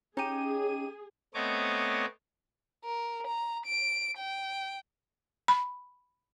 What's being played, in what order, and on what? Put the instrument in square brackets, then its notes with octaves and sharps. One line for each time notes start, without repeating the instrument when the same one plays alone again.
[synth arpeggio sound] C#4 D#7 [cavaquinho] D#4 G4 [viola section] G#4
[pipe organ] A3 B3 C4 C#5 D#5 D6
[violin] A#4
A#5
D7
G5
[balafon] B5